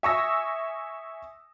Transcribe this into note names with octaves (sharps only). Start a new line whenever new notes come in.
E5 G#5 C#6 D#6 E6 A#6